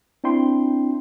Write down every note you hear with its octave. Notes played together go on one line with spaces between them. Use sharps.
C4 D4 E4 G5 C6